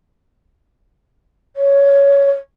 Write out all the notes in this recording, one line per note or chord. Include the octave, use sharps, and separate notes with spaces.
C#5